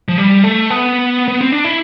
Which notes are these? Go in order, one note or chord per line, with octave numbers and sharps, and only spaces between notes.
F3
G3
A3
B3
B3
C4
D4
E4